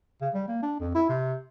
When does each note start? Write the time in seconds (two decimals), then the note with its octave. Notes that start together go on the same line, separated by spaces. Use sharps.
0.21 C#3
0.34 G3
0.48 A#3
0.62 D4
0.80 F2
0.95 E4
1.09 C3